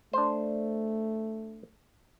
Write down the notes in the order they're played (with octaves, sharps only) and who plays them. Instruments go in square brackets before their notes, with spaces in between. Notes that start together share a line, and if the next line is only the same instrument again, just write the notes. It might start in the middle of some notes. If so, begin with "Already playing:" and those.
[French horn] A3 [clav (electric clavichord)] D4 C5